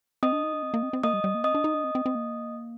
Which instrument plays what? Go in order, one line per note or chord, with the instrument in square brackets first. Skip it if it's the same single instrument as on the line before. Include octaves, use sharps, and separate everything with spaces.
[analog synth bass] C4 [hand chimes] D#5 D#6
[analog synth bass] D4
D#4
D4
C4
A#3
C4
C4
[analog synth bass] A#3 [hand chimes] D#5 D#6
[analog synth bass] G3
G3
A#3
[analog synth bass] C4 [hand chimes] D#5 D#6
[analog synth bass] D4
D#4
D4
C4
C4
C4
A#3